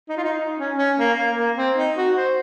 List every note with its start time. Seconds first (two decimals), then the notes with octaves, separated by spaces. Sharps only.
0.09 D#4
0.18 F4
0.24 D#4
0.38 D#4
0.58 C#4
0.78 C#4
0.98 A#3
1.18 A#3
1.38 A#3
1.57 C4
1.77 D#4
1.97 F#4
2.17 C5